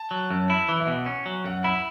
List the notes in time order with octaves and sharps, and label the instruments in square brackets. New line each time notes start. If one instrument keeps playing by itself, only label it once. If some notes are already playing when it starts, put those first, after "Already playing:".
Already playing: [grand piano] A5
[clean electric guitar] F#3
F#2
E4
E3
[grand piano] E5
[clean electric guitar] B2 [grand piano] F#5
[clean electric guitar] C#4
F#3
[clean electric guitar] F#2 [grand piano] F#5
[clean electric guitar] E4 [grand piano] B5